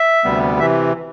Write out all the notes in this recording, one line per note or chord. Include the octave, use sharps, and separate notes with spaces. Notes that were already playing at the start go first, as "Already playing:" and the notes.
Already playing: E5
D2 C3 G3 B3
C3 E3 E5